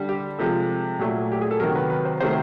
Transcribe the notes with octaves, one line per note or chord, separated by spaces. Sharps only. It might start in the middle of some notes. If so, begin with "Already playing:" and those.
Already playing: D3 G3
G4
C3 F3 G#3 A4
A#2 F#3 A3
G4
G#4
A4
C3 D#3 F#3 A#4
B4
B4
C5
C3 D#3 F#3 A3 C5